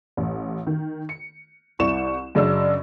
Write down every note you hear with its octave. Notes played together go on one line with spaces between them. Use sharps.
A1
D#3
C#7
C2 E4 D5 C#6 E7
F#2 C#3 D4 D#5 E6